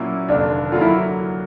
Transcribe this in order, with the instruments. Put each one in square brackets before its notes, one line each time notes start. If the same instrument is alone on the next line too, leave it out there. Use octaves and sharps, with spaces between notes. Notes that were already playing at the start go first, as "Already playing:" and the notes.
Already playing: [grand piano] A#2 F#3 A#3 C#4 E4
[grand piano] F1 D#2 D3 [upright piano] D4
[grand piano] D3 F#3 A#3 [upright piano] F4
[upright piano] E4